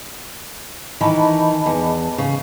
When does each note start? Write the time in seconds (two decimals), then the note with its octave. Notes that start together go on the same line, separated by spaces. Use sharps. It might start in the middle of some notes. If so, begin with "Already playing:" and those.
1.01 D#3 E3 D#5 A5 B5
1.66 E2
2.18 C#3